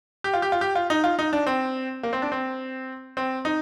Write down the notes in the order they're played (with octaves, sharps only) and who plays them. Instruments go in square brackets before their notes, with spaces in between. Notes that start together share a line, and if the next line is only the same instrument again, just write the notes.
[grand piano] G4
F4
G4
F4
G4
F4
D#4
F4
D#4
D4
C4
A#3
C4
D4
C4
C4
D#4